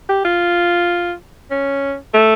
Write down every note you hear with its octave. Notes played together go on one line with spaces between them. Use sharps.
G4
F4
C#4
A3